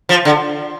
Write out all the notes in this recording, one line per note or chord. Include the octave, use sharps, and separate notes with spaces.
F3
D3